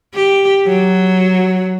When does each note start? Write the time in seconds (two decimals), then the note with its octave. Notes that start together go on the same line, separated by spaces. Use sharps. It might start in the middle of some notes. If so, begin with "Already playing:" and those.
0.14 G4
0.67 F#3